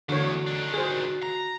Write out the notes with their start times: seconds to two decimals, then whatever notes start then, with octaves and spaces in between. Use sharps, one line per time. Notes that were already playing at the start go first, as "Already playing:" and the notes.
0.09 E2 D3 F#4 C#5
0.47 D#3 D4
0.74 F#4 G#4 C5
1.23 A#5